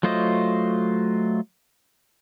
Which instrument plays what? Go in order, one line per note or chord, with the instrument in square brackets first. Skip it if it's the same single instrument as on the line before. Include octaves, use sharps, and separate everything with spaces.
[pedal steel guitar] F#3 A3 F4 C5 D#5